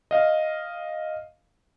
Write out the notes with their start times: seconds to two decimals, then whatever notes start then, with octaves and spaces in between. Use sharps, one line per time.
0.11 D#5 F5